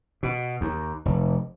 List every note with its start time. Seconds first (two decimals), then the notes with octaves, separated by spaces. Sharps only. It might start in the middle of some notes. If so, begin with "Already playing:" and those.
0.23 B2
0.61 D#2
1.05 F1